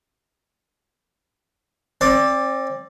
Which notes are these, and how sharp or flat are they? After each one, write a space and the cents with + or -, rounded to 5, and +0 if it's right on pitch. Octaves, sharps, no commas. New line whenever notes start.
C4 +35 D5 +0